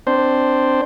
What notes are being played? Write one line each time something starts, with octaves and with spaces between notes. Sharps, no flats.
C4 D4 C5